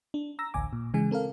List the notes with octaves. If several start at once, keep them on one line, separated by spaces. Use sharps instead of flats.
D4
A#5 E6 A#6
A1 D2 G#5 D6
A#2
C#3 E3 G#3 G#5
C4 A4 A#4 F5